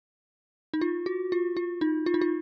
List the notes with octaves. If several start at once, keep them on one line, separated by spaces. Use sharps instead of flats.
D#4
F4
F#4
F4
F4
D#4
F4
D#4
F4